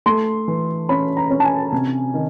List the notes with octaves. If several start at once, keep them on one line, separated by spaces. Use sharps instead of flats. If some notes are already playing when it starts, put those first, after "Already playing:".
A3 C6
E3
C#4 B5
A#5
C#4
A5
G#5
C3
D#3